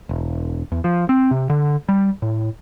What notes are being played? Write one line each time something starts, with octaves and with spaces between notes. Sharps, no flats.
E1
E2
F3
C4
C3
D3
G3
A2